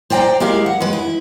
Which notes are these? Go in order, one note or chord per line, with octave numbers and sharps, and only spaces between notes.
C5 D5 G5 G#5 A#5
G#3 E4 G4 A#4 F5
F#5
G#3 B4
E4